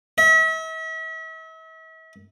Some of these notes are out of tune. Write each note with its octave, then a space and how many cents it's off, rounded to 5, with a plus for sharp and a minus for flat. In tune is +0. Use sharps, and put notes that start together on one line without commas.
E5 -40